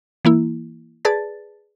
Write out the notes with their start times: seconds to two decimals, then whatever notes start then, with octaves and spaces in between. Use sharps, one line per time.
0.25 E3 A#3 E4
1.05 G#4 B4 D5 A5 A6